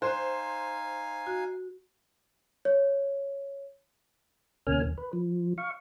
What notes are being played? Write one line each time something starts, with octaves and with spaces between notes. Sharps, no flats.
D#4 C5 F5 G#5 F#6
F#4
C#5
D2 B2 A#3 C#4 G#5 F6
D#2
B4
F3
F5 C#6